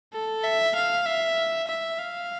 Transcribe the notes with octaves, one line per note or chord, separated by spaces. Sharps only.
A4
E5
F5
E5
E5
F5